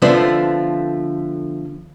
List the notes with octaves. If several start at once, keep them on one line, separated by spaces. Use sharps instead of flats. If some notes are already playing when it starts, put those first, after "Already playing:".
D3 F3 A3 B3 C4